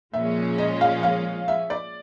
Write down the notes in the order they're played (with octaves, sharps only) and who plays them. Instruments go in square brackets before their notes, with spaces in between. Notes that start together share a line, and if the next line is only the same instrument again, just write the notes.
[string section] A#2 F3 G#3 C#4 [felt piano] E5
[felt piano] D#5
F5
F5
E5
D5